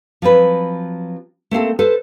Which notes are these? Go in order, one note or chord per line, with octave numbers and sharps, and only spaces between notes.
F3 F#3 C4 B4
A3 A#3 C4 A4
A4 B4 C5